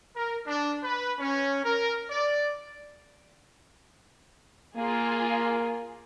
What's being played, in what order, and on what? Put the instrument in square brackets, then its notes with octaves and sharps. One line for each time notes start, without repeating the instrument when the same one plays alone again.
[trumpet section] A#4
D4
B4
C#4
A#4
D5
[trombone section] A#3 [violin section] F4 G#4